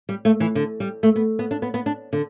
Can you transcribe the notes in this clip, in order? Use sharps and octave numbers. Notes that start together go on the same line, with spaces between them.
G3
A3
E3
D3
G3
A3
B3
B3
D4
B3
B3
D4
D3